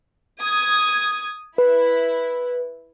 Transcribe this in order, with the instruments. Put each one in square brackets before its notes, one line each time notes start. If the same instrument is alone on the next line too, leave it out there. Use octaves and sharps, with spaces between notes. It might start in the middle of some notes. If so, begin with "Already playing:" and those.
[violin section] D#6 G#6
[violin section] E4 [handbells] B4